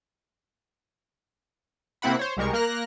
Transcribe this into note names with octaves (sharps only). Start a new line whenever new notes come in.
C3 A#3 C4 E4 F#5 B5
C5 C#5
C2 G3 G#3 A#4 C#6
A#3 A#4 F6 F#6 A#6